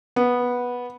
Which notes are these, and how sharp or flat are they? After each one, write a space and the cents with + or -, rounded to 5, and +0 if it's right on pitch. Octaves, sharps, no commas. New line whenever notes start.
B3 -10